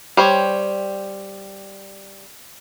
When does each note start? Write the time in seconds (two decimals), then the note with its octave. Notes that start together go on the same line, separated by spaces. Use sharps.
0.17 G3 C5 C#5